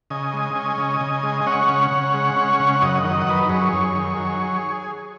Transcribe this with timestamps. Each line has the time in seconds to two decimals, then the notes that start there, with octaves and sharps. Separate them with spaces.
0.10 C#3 D#5 G#5
0.33 G#3
0.55 C#4
0.78 C#3
1.01 C#3
1.23 G#3
1.41 G#5
1.46 C#4 C#5 F#5
1.69 C#3
1.91 C#3
2.14 G#3
2.36 C#4
2.60 C#3
2.82 F#2 D#5
2.90 F#5
2.97 D#5
3.04 D#3 F#5
3.14 D#5
3.21 F#5
3.27 F#3 B4 D#5
3.43 D#5
3.49 F#2 G#4 C#5
3.73 F#2
3.95 D#3
4.17 F#3